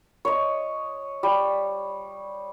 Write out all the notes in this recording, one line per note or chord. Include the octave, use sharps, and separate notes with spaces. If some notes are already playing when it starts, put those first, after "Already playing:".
C#5 D#5
G3